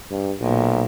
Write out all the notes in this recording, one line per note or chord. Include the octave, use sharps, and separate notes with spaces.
G2
B1 A#2